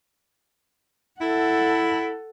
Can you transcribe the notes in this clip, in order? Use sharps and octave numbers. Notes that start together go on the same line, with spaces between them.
E4 A4 F#5